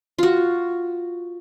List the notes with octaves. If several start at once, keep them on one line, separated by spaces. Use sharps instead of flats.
F4 F#4